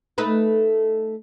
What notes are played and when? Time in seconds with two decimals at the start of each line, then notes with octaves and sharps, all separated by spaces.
0.18 A3 D#4 B4